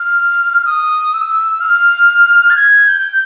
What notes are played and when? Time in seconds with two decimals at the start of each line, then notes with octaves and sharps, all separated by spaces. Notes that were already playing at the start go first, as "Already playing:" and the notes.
Already playing: F6
0.66 D#6
1.14 E6
1.61 F6
2.50 A6
2.56 G#6
2.87 G6